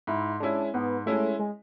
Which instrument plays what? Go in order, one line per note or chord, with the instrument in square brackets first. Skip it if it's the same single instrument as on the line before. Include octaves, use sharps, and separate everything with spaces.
[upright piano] G#2 [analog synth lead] E4
[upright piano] G#3 C#4 E4 [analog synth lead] D4
[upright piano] G#2 [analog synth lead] B3
[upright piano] G#3 C#4 E4 [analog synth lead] A3
[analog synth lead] G#3